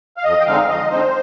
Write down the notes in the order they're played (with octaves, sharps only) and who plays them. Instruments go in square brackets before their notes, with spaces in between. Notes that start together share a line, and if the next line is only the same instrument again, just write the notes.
[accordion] F5
F2 D#5
G5
D3 G#3 C4 D#4 F5
F2 D#5
D3 G#3 C4 D#4 C5